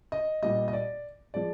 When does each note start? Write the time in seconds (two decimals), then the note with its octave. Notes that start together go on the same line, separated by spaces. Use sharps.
0.12 D#5
0.42 A#2 G3 D#5
0.68 D#5
0.73 D5
1.34 F3 G#3 D5